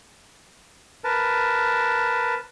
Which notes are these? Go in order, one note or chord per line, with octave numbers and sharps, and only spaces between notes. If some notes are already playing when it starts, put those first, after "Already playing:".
A#4 B4 A5